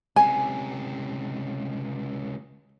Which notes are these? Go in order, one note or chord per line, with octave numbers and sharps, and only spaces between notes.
C#2 C3 G#5